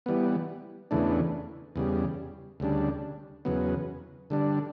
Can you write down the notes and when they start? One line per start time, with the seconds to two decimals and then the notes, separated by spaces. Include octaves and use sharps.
0.06 E3 G3 B3
0.91 E2 C#3 E3 A3 D4
1.76 E2 C#3 G3
2.60 D2 C#3 G3 D4
3.45 E2 C#3 F#3 B3
4.30 D3 G3 D4